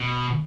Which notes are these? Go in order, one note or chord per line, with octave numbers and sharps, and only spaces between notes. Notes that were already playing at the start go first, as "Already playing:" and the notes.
Already playing: B2